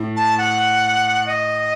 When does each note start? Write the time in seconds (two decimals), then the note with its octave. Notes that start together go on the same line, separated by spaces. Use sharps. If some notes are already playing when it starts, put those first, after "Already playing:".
Already playing: A2
0.16 A5
0.38 F#5
1.26 D#5